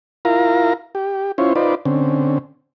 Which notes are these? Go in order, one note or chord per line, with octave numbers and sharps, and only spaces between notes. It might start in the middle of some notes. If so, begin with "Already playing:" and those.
E4 F4 A#4 F5 A#5
G4
C#4 E4 F4 C5 C#5
D#4 F4 B4 C5 D5
D3 C4 C#4